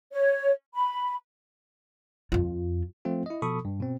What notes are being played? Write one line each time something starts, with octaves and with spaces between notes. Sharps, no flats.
C#5
B5
F2 F4
F3 A3 C4 F4
E4 D#5
B2 F3 A4 B5 C#6 D#6
G2
B2 C4